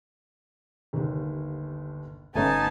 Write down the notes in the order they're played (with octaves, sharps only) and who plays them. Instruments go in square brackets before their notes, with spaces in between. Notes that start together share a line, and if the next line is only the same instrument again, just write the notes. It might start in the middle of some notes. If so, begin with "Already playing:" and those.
[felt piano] G1 D#2
[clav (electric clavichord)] G1 A3 C#4 [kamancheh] B3 A5 [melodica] D#4 G#5